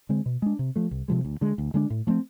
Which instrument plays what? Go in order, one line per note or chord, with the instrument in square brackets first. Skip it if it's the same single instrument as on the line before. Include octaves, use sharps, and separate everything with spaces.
[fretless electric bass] D3 G#3 C4
B2
G#3 D4
C3
F3 A3
C2
C3 F3 G#3
D2
D3 G#3
D2
D3 G#3 D4
A2
F3 A3 C4